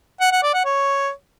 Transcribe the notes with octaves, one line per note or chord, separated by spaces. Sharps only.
F#5
F#5
D5
F#5
C#5